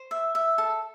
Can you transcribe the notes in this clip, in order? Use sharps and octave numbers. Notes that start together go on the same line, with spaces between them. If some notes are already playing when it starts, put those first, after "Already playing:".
Already playing: C5
E5
E5
A4